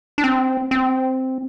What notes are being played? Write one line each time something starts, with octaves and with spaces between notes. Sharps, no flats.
D4
C4
C4